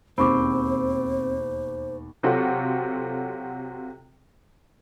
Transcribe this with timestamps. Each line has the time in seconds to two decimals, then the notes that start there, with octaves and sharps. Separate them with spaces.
0.18 E1 D#2 C4 C5 B5 C#6 D6
2.23 C3 F#3 C4 F4 F#4 A4